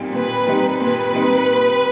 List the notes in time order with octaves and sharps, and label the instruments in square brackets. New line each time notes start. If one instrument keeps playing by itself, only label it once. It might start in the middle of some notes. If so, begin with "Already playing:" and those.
Already playing: [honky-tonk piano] A#2 G3 C4 D#4
[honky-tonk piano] A#2 [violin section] B4
[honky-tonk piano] G3 C4 D#4
[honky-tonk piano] A#2 [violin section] B4
[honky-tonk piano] G3 C4 D#4